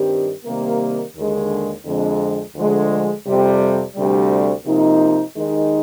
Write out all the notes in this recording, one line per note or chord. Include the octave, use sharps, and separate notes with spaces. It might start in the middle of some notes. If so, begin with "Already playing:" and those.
Already playing: G2 D#3 G3 C4 G4
C3 D#3 G3 A#3
D#2 D3 G#3
F2 D3 G#3
D2 D3 F3 G#3
F2 C3 G3
D2 C3 G3
C3 F3 A#3 D#4
D#2 D#3 G#3 D#4